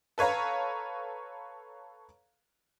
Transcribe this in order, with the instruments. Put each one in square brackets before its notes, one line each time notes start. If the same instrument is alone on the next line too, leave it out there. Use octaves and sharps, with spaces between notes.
[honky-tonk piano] A4 B4 C#5 F5 A#5